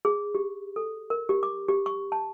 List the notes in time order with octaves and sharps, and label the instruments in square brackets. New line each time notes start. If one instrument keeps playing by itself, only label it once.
[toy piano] G#4
G4
A4
A#4
G4
D6
G4
C#6
A5